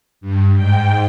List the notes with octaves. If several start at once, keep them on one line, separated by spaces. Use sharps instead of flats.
G2
G#2 G5